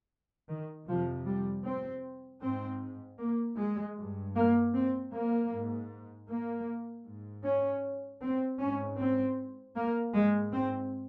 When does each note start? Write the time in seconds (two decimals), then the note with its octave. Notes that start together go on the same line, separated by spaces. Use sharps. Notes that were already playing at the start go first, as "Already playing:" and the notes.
0.49 D#3
0.87 F2 C3 F3
1.26 G3
1.65 C4
2.42 G#2 C4
3.19 A#3
3.58 G#3
3.96 G2
4.35 A#3
4.73 C4
5.12 A#3
5.51 G#2
6.28 A#3
7.05 G#2
7.44 C#4
8.22 C4
8.60 G#2 C#4
8.98 C4
9.75 A#3
10.14 G#2 G#3
10.53 C4